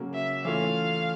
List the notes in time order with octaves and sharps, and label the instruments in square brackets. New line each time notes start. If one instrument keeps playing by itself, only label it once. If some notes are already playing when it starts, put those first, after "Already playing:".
Already playing: [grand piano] C#3 F#3 A#3 C#4
[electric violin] E5
[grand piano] E3 A3 C#4 F4 [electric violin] F5